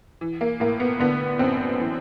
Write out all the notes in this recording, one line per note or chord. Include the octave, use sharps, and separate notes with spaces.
E3
A#3
A2 A#3
B3
D3 B3
F#2 C4
E3